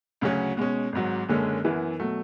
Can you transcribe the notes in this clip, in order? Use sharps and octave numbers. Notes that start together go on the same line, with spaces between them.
D2 C#3 F#3 C#4 F#4
B2 G#3 C#4
G#1 G#2 F#3
F#1 F#2 D3 G#3 C#4
F#2 E3 B3 E4 B4
B2 F#3 A3